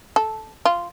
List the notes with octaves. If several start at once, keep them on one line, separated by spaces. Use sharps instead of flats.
A4
F4